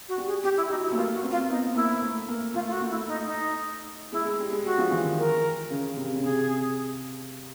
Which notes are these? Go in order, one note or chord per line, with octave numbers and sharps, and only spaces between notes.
F#4
G3
G#4
G3 G4
E4
F#3 D#4
E4
A3
A#3 F4
F#4
C4
F4
B3 D#4
A#3 E4
A3
A#3
A3 F4
F4
F#4
A3
E4
D#4
D#4
G#3 E4
G#3
G3
G#3
G3 F#4
F3
E3
D#3
A#4
C#3
C3
C#3
C3 G#4